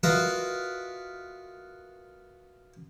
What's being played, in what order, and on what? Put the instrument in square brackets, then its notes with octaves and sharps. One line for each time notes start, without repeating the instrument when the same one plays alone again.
[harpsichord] F4 F#4 A#4 B4 D#5 E5